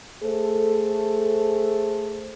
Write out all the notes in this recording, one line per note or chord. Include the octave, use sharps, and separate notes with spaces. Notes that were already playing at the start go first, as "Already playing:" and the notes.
A3 G#4 A4 C5